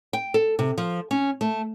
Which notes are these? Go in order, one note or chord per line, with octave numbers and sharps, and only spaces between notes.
G5
A4
C3
F3
C#4
A3